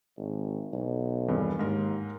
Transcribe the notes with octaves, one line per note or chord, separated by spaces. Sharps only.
G#1
B1
E1 G2
D#2 G#2 A#4